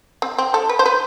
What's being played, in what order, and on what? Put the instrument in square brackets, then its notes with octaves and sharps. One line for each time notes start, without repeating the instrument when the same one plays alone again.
[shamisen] C4
C4
A4
B4
C5
B4